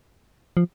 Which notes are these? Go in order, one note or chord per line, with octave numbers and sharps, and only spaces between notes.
F3